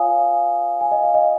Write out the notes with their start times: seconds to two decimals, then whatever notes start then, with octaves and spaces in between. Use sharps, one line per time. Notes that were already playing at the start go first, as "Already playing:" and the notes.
Already playing: F4 A#4 C#5 F5 G#5 D#6
0.80 G#5
0.91 D#5
1.03 F5
1.14 D#5